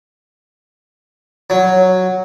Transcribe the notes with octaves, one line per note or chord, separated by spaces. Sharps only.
F#3